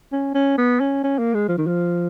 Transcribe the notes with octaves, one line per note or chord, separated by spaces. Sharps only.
C#4
C#4
B3
C#4
C#4
A#3
G#3
F3
D#3
F3